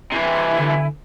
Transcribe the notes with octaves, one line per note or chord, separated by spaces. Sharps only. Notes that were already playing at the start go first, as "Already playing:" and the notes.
C3 E3 E4 G#5
D3